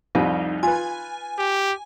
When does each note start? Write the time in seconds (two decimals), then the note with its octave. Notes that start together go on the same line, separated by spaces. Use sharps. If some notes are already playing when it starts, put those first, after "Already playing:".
0.15 C2 F2 G3 D#4
0.63 F4 B4 G#5
1.38 G4